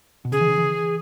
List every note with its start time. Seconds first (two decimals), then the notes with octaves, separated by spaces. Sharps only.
0.25 B2
0.32 C#3 G#4
0.41 E3
0.49 C#3
0.58 E3